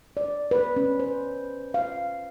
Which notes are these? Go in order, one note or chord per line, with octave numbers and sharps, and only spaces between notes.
D5
B4
C#4
C5
F5